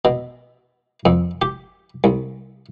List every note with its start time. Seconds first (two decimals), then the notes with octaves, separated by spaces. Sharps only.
0.05 B2
1.05 F2
1.42 G4
2.04 C2